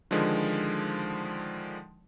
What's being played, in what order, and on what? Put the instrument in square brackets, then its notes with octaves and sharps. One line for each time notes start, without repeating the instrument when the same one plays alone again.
[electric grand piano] D3 D#3 F3 G#3